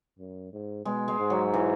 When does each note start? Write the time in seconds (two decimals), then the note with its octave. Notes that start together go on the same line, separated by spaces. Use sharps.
0.19 F#2
0.53 G#2
0.85 B2 G#3
1.08 G#3
1.19 G#2
1.30 F#3
1.54 E3